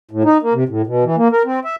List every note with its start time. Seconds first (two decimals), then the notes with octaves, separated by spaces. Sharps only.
0.11 A2
0.24 D#4
0.42 A#3
0.54 C3
0.69 A2
0.87 B2
1.04 E3
1.17 A#3
1.32 A#4
1.45 C4
1.65 E5